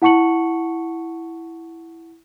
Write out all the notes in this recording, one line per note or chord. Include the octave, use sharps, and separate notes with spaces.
E4 F#5 A5 C#6 C#7 F#7